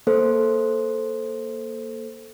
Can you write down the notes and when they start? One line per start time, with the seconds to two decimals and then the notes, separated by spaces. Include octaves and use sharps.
0.07 A#3 A4 C5